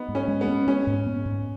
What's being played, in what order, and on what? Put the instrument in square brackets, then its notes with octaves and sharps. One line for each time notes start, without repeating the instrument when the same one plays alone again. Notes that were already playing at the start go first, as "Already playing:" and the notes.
Already playing: [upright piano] B3 D#4
[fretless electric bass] G#2
[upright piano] C#4
[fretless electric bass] G#3
[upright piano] B3
[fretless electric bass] C#4
[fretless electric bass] B3 [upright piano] C#4
[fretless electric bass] G#2
B3
G#2